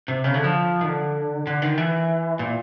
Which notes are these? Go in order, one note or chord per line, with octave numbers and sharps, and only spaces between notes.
C3
C#3
D3
F3
D#3
D3
D3
D#3
E3
A#2